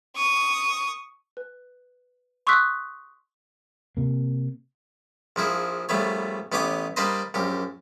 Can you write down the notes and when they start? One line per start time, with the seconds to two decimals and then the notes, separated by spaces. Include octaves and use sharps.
0.16 C#6 D#6
1.37 B4
2.47 C6 C#6 D#6 E6 F#6 B6
3.97 C3 A#3
5.36 A#1 F3 E4 G#4
5.89 A#1 G3 A3 B3 C#5
6.52 A1 B3 G4 C#5 D6 D#6
6.96 G3 A#3 D4 B4 C5 D#5
7.34 A#1 F#2 G4